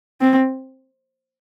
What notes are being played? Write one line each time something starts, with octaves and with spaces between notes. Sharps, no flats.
C4